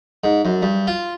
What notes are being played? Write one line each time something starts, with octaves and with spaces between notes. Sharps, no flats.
G#2
F#2
G2
F4